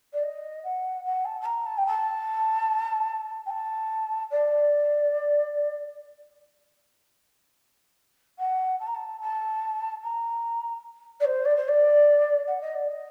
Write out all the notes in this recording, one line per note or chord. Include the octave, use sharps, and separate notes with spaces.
D5
D#5
F#5
F#5
A5
A5
A#5
A5
G5
A5
G5
A5
D5
F#5
A5
A#5
A5
A5
A#5
D5
C5
D5
C5
D5
F#5
D#5
D5
D#5